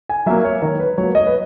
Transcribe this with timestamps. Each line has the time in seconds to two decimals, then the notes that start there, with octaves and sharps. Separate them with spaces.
0.09 G#5
0.26 F#3 A#3 E5
0.45 C#5
0.62 D#3 A#4
0.80 B4
0.98 F#3 A#3 C#5
1.15 D#5
1.27 B4